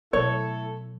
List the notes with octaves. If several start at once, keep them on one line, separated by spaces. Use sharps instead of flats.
B2 F#3 A3 E4 A4 C#5